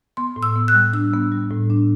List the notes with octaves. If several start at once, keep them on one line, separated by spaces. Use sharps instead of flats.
B3 C6
A2
E6
B3
F#6
G3
D4 E6
B3
G3
A2
D4